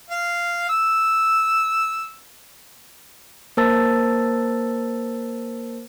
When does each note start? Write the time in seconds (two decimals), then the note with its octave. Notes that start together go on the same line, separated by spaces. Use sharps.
0.11 F5
0.69 E6
3.57 A#3 A#4 C5 A5 E6 A6